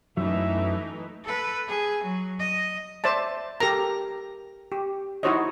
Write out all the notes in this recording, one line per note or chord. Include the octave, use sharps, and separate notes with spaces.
F#2 E3 F#3 A3 D#4 E5
A4 B4
G#4
F#3
D#5
C5 D5 E5 A5
G4 A4 A#4 A#5
G4
D#4 E4 F#4 C5 C#5 D#5